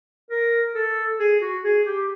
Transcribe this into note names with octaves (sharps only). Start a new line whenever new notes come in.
A#4
A4
G#4
F#4
G#4
G4